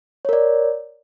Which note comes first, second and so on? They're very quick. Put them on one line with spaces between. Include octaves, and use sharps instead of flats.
C#5 A#4 D5